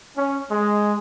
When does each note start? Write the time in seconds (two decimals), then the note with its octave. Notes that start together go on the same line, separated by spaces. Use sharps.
0.16 C#4
0.49 G#3